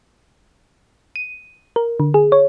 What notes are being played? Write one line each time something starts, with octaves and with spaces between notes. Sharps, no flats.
D#7
A#4
D3
G#4
C#5